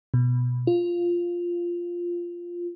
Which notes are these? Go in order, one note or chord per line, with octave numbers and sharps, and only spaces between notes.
B2
F4